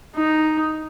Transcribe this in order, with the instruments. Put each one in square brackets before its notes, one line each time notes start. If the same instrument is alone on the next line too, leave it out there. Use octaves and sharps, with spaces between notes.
[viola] D#4